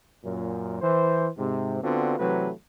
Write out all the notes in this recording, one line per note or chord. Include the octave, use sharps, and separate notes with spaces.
F#2 A#2
E3 C5
G#2 C3
D3 B3 C4 D4 F4 F#4
C3 E3 F#3 A3 G4 B4